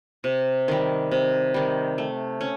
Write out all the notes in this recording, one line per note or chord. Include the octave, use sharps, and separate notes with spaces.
C3
D#3 G3
C3
D#3 G3
A3
C#4